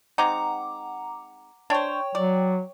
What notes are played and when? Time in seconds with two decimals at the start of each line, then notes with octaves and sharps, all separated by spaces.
0.18 G#3 C4 D#4 F#5 A#5 D6
1.70 D4 C5 C#5 G5 C#6
2.15 F#3 D5